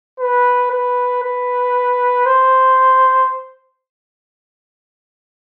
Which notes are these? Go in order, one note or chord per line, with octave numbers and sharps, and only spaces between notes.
B4
B4
B4
C5